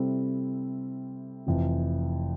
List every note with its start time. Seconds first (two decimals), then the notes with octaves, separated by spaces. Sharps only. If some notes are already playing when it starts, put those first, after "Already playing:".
Already playing: C3 G3 C4 E4 A4
1.47 F1 F2 E3